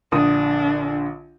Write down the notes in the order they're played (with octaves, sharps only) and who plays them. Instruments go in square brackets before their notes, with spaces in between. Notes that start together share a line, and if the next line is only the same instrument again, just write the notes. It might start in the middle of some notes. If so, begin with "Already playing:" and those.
[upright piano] A#1 D3 D#6 [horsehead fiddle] D4